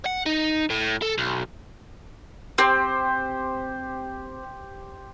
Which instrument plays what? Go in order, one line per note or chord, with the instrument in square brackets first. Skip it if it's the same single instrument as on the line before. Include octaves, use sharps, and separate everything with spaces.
[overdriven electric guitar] F#5
D#4
A2
A4
B1
[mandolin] C4 [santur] G4 C5